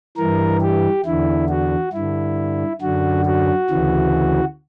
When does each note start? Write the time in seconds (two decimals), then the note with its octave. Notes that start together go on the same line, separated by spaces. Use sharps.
0.17 G2 E3 A#4
0.61 G4
1.05 E2 D3 E4
1.49 F#4
1.93 G2 D3 E4
2.81 F#2 D3 F#4
3.25 F#4
3.70 D2 C#3 E3